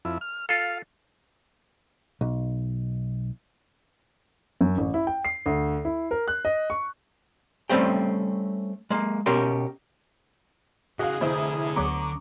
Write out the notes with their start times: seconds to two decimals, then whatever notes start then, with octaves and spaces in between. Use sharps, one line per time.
0.05 F2 E4
0.21 F6
0.49 F4 A4 F5
2.21 B1
4.61 F#2
4.78 A1
4.94 E4
5.07 G5
5.25 C7
5.46 D2
5.85 E4
6.11 A#4
6.28 F#6
6.45 D#5
6.70 C#6
7.70 G3 A3 C4 C#4 C5 G5
8.90 G#3 A#3
9.26 B2 C#4 G4 A#4 G5 C6
10.99 C#3 E3 F#4 G#4 D#5 F5
11.21 F1 D3 E4 C5 D#6
11.76 D2 F#3 B3 A#5 C#6 D6